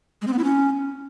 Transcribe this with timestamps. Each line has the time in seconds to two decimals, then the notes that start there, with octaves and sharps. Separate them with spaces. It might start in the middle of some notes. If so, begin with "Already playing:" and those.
0.22 G#3
0.27 C4
0.33 B3
0.39 E4
0.44 C#4